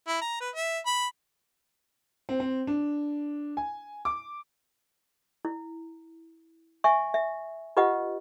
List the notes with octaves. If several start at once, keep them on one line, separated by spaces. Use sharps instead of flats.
E4
A#5
B4
E5
B5
C4
C4
D4
G#5
D6
E4
E5 G#5 C#6
E5
F4 G4 B4 D#5 F#5